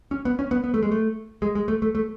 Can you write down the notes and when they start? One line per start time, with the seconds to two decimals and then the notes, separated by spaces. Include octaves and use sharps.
0.11 C#4
0.25 B3
0.39 C#4
0.51 B3
0.64 B3
0.74 A3
0.82 G#3
0.92 A3
1.42 G#3
1.55 G#3
1.68 A3
1.82 A3
1.95 A3